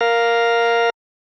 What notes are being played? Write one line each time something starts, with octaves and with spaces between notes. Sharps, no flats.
A#4 F5